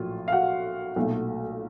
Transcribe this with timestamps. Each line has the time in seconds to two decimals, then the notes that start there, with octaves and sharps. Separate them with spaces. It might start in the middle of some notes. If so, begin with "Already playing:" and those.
Already playing: A#1 A2 F#3 F4
0.28 F5
0.32 F#4 F#5
0.96 B1 A#2 F#3 A3